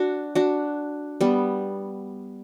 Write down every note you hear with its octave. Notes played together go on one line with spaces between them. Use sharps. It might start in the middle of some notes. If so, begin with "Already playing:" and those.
Already playing: D4 F#4
D4 F#4
G3 B3